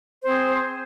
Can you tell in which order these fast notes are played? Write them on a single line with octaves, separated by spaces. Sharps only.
C5 C4 G#4